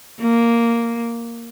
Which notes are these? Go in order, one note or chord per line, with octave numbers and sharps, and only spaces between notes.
A#3